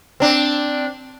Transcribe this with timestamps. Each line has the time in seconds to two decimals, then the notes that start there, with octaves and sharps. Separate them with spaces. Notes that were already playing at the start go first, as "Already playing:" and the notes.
0.20 C4 D4